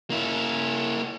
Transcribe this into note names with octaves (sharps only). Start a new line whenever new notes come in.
A#3 E4